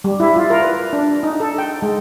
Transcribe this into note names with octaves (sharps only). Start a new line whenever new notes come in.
G3
E4
F4
A#4
B4
D4
D#4
A4
G5
G#3